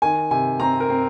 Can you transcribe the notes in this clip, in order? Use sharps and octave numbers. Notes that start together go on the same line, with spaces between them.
D#3 G#5
C3 G#5
C4 A#5
A#4
C4